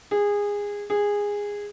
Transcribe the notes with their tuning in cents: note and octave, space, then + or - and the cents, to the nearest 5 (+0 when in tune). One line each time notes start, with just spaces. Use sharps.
G#4 -20
G#4 -15